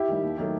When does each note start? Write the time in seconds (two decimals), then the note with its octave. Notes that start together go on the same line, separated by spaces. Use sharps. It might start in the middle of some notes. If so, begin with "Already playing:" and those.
Already playing: E4 G4
0.08 D#3 G3
0.23 D#2
0.38 D#3 F#3 A3